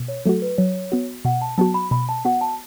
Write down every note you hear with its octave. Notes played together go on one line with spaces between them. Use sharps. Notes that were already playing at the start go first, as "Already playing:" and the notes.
Already playing: B2
C#5
F#3 A3 F#4 A4
B4
F#3 C#5
B3 F#4
B2 F#5
A5
F#3 B3 F#4 A5
B5
B2 B5
A5
B3 F#4 F#5
A5